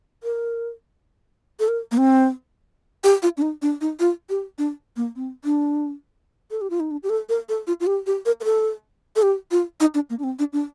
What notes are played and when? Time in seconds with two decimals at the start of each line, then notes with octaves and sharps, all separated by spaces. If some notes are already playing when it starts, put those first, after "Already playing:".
0.23 A#4
1.60 A4
1.68 A#4
1.91 A#3
1.97 C4
3.04 G4
3.22 F4
3.37 D4
3.42 D#4
3.62 D4
3.81 D#4
4.00 F4
4.29 G4
4.58 D4
4.96 A#3
5.15 C4
5.45 D4
6.51 A4
6.61 G4
6.70 F4
6.80 D#4
6.91 D4
7.03 G4
7.09 A4
7.29 A#4
7.49 A4
7.67 F4
7.80 F4
7.87 G4
8.06 G4
8.26 A#4
8.40 A#4
8.44 A4
9.16 A4
9.22 G4
9.51 F4
9.80 D#4
9.94 D4
10.10 A#3
10.19 D4
10.23 C4
10.39 D4
10.53 D4